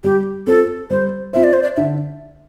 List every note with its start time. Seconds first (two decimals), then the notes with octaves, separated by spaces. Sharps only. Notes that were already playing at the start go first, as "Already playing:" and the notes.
0.04 G3 G4
0.47 C4 F4 A4 C5
0.90 G3 C5
1.33 C4 F4 C5 E5
1.44 D5
1.53 C5
1.63 D5
1.76 D3 E5